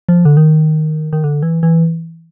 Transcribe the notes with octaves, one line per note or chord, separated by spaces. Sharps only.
F3
D3
D#3
D#3
D3
E3
E3